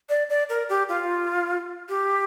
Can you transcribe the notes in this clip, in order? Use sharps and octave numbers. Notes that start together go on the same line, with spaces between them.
D5
D5
A#4
G4
F4
G4